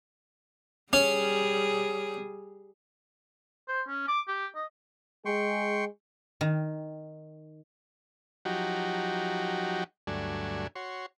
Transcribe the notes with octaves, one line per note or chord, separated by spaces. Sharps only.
G3 C#4 G#4
C5
C#4
D6
G4
D#5
G#3 G#4 G5 C6 C#6
D#3
F3 F#3 D#4 F#4 G4
D2 G2 F#3 A3 D4 G#5
F#4 C#5 C6